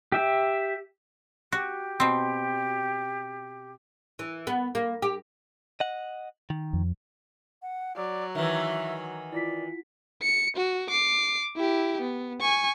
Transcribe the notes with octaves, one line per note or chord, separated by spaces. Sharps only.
G4 E5
F#4 G4
B2 C4
E3
B3
A#3
G4
D#5 F#5
D#3
F2
F#5
F#3 D5
D#3 E3 E5
E4 F4 D5 B6
C#7
F#4
D6 C7
E4 G4
B3
G#5 C#6